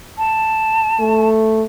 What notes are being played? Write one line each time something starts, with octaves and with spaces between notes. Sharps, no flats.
A5
A3